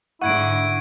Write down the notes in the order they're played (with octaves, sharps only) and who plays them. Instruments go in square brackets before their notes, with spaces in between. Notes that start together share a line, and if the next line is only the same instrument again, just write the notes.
[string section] G#2 D3 [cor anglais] E4 [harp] F#5 [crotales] C#6 G#6 D7